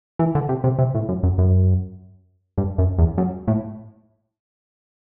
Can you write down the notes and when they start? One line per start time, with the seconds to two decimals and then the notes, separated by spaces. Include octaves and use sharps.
0.19 E3
0.35 D3
0.49 C3
0.64 C3
0.79 C3
0.95 A2
1.09 F#2
1.23 F#2
1.38 F#2
2.58 G2
2.78 F#2
2.98 E2
3.18 F#2
3.47 A2